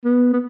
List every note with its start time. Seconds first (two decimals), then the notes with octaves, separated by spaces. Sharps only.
0.05 B3
0.33 B3